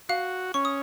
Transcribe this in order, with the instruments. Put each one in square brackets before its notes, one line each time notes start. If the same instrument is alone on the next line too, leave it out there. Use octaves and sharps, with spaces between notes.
[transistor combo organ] F#4 [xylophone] F5
[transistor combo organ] C#4 [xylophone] C#6
[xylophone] D#6